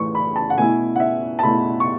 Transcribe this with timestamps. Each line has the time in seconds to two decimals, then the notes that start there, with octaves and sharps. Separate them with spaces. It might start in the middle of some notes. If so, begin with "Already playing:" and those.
Already playing: A2 E3 A3 C#6
0.15 B5
0.36 A5
0.50 F#5
0.57 B2 A3 E4 G#5
0.96 F#5
1.00 E5
1.39 A5
1.43 B2 A3 E4 B5
1.80 C#6